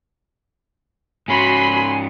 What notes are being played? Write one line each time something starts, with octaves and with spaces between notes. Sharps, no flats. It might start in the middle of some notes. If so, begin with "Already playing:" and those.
G#2 C#4 F#4 G#5 B5 C6